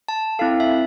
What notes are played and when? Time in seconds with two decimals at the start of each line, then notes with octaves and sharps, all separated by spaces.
0.08 A5
0.39 C4 E4 A4 F5
0.60 E5